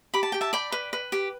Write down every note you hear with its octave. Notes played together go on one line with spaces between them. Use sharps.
G4 B5
A5
G4 G5
E5 A5
D5 G5 B5
B4
B4
G4